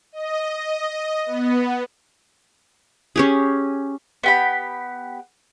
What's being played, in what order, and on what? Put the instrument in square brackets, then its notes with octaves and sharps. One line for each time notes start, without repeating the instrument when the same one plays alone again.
[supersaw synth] D#5
B3
[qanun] C#4 G4 G#4
[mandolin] B3 G4 B5